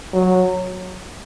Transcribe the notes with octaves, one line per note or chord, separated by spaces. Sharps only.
F#3